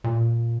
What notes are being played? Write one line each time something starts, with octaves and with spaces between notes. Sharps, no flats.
A#2